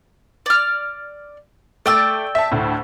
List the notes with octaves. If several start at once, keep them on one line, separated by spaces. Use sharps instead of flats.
D5 F6
A3 D5 G5 E6 A6 D7
E5 A5
D2 A2